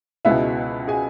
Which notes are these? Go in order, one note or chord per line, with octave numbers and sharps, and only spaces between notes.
C#2 B2 G#3 B3 E4 E5
G#4 G#5